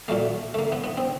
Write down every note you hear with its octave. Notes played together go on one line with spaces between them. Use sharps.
A#2 F#3 A3 A#3
A3
A#3
B3
B3
C4